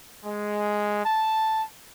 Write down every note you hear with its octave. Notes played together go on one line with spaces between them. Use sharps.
G#3
A5